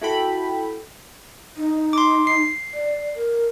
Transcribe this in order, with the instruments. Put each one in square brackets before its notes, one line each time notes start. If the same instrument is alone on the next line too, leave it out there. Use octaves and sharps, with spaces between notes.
[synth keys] E4 F#4 A4 G5 B5
[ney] D#4
[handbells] C6 D6
C7
[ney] D5
A#4